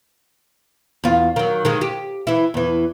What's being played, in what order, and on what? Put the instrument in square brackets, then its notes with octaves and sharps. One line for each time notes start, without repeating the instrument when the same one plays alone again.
[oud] E2 F4
D#3 F#3
D#3 G#3
G4
E3 E4
E2 E3